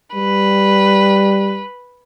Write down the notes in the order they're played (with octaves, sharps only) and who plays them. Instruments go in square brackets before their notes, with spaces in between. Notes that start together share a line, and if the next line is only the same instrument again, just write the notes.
[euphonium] G3 [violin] B4